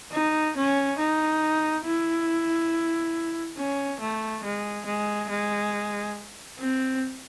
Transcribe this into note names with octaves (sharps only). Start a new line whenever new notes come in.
D#4
C#4
D#4
E4
C#4
A3
G#3
G#3
G#3
C4